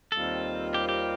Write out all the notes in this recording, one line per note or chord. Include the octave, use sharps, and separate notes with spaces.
D#2 D#3 G3 C4 F4 A4
G4
G4